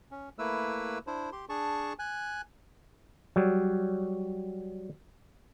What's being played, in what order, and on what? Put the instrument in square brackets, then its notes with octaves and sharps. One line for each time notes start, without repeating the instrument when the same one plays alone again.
[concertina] C#4
A3 A#3 E4 B4 E6
D4 E4 C5
G4 C6
D4 G#4 A5 C#6
G#5 F#6
[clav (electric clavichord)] F#3 G3